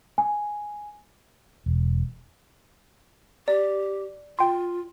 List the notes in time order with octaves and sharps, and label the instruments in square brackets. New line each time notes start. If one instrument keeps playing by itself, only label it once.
[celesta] G#5
[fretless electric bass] E1
[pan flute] G4 [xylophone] D5
[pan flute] F4 [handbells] G5 C6